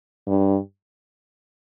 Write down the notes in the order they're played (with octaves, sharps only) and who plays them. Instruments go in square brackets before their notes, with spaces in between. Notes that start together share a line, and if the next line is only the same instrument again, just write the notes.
[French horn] G2